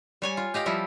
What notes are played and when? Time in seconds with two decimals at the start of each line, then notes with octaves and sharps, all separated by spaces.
0.22 G3 C#5 G#5
0.37 F4
0.54 G4 D#5 F5 G5
0.66 F3 G3 E4